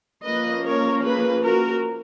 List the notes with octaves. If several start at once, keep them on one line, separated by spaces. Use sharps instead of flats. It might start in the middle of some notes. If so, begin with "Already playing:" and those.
F3 A#3 C#4 B4 D#5
A#4 C#5
G#4 B4
F#4 A#4